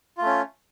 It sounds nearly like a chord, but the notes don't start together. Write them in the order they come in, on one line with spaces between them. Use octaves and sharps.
F4 A3 C#4